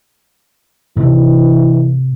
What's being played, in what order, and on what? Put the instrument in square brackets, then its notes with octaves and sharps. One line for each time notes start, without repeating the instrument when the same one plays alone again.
[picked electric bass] G#2 C3 [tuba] E3